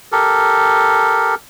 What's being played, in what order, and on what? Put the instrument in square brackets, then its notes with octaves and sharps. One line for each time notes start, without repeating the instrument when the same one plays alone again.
[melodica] G4 A4 A#4